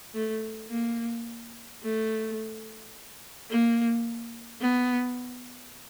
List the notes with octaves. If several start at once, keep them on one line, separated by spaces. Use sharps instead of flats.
A3
A#3
A3
A#3
B3